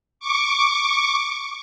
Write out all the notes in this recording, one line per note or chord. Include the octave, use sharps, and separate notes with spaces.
C#6 D6